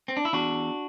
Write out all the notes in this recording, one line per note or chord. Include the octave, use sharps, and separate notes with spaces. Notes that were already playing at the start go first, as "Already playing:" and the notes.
C4
D4
E4
E2 D4 F#4